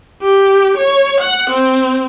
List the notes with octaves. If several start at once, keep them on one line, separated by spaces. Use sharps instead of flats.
G4
C#5
F#5
C4